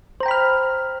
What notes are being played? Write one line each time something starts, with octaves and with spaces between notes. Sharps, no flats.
C5 G5 A#5 B5 F6